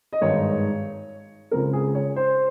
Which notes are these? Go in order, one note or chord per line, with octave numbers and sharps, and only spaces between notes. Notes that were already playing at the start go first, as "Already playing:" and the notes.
D#5
G#1 G2 D#3 G#3 D#4 C#5
C#2 C#3 G#3 C4 A#4
G#4
C#5
C5